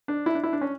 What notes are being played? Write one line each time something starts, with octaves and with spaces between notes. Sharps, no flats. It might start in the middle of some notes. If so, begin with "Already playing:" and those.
D4
E4
D4
E4
D4
C#4